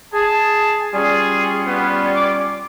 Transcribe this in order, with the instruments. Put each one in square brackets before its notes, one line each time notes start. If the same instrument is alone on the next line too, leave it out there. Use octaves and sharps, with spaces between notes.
[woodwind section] G#4 [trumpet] A5
[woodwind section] G3 C#4 F4 [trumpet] G#4
[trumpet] B3
D6